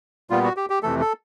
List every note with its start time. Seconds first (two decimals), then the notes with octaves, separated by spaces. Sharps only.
0.30 A#2 G3 B3 F4
0.44 F#4
0.57 G4
0.70 G4
0.83 F2 C3 E3 A3 A4
1.01 A4